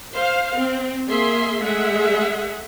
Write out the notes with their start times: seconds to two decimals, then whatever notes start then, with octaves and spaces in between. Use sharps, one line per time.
0.13 C5 F5
0.58 C4
1.08 A#3 G#4 E5 C6
1.62 G#3 A3 G#4 E5 F#5